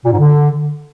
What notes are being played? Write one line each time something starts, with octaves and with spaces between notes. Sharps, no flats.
A#2
G#2
D3